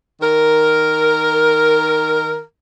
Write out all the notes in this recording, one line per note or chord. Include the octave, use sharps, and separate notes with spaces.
D#3 A#4